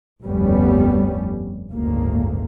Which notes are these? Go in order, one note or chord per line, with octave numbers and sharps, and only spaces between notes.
F1 D2 G2 G3 B3 C#4
F#1 D2 G#2 A#3